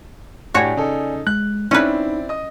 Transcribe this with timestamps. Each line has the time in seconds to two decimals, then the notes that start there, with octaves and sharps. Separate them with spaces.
0.54 A2 D4 F#4 G4 C#5 D5 G#5
0.77 C#3 D#4 A4
1.27 G#3 F#6
1.71 C4 C#4 D#4 E4 B4 D5
2.29 D#5 D#6